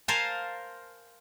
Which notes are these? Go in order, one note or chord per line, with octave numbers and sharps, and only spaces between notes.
A#4 C5 F5 G#5 A5